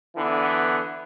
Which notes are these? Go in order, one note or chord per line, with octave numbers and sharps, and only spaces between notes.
D3 E3 B3